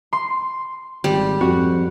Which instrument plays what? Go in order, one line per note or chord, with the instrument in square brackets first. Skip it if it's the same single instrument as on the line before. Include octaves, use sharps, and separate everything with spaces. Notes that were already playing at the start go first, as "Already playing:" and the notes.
[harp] C6
[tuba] G#1 [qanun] G3
[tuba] F2 [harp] F#4